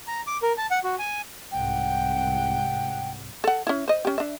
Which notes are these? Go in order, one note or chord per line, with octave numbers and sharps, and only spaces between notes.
A#5
D6
A#4
A5
F#5
F#4
G#5
C2 G#2 C3 F#5 G5
A4 F#5
C#4 E4
C5 D#5
C#4 G4
D4 E5